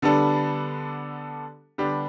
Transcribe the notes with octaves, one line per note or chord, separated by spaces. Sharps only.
D3 G3 B3 D4 A4
D3 G3 B3 D4 G4